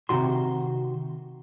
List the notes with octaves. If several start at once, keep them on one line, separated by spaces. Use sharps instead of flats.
C3 D#3 F#4 C6